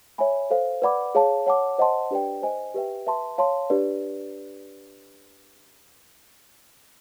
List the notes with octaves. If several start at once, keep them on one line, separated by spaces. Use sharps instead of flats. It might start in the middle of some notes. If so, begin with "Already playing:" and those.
C#5 E5 G#5 B5
A4 C5 F5
B4 D5 F#5 B5 D6
G#4 C#5 F5 A5
C#5 F#5 A5 D6
C5 D#5 F#5 A5 C6
D4 G4 B4 D5 G5
C5 D#5 G#5
G4 B4 E5 G5
B4 E5 A5 C6
C#5 F5 A5 C6
D4 G4 B4 D5